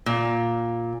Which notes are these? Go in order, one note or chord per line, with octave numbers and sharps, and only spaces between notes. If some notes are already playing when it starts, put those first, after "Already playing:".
A#2